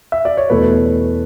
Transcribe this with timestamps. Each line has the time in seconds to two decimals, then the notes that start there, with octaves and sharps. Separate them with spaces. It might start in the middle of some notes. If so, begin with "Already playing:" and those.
0.12 E5
0.25 D5
0.37 C#5
0.50 E2 B2 A3 B4